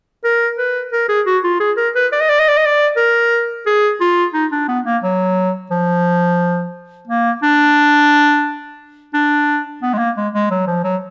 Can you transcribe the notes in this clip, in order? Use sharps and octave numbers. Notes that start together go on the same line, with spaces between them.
A#4
B4
A#4
G#4
F#4
F4
G#4
A#4
B4
D5
D#5
D5
D#5
D5
D#5
D5
A#4
G#4
F4
D#4
D4
B3
A#3
F#3
F3
A#3
D4
D4
B3
G#3
A#3
G#3
G#3
F#3
F3
F#3